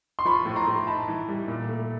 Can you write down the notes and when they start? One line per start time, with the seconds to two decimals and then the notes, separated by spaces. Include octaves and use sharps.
0.19 C6
0.25 F3 B5 C#6
0.45 A2
0.56 A#5 C6
0.67 A2
0.87 D#4 A5 B5
1.08 E3
1.28 G3
1.48 A#2
1.69 A3